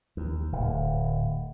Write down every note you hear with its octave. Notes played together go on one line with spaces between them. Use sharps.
D#2
D1